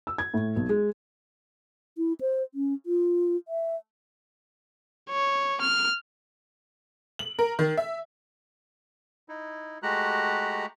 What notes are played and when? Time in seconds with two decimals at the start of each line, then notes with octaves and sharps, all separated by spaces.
0.07 E6
0.18 G#6
0.34 A2
0.56 B1
0.69 G#3
1.98 E4
2.21 C5
2.55 C#4
2.86 F4
3.48 E5
5.11 C#5
5.61 F6
7.19 F#7
7.39 A#4
7.59 D#3
7.77 E5
9.29 D#4 E4
9.83 G#3 A3 F#4 G4 A#5 F#6